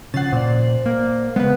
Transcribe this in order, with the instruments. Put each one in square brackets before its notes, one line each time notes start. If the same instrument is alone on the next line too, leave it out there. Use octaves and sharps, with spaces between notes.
[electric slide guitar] C#3 F3 F#5 [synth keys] A6 C7
[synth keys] A#2 [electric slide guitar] C5 D5
[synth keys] A#3
[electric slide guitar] C#3 G#3 [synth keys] B3 B4